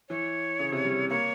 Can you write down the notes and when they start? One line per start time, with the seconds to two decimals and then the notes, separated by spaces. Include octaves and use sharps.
0.09 E3 C#5
0.59 C#3
0.72 C3
0.85 G3
1.10 A#3 C#5